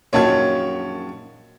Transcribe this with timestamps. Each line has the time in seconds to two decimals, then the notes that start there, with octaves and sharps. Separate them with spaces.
0.13 A#1 F#2 D#3 C#5 A5 G#6